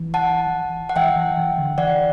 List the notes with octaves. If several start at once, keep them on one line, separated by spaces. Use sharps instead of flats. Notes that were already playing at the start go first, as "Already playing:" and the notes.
Already playing: E3
F#5 A5
F#5
E3 E5 G5
E3
E3
D3
E3 D5 F#5